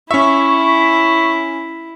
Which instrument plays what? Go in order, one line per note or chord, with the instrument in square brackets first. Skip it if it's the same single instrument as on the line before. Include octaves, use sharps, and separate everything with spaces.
[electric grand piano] C#4 E5 [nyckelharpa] E4 [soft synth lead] C#6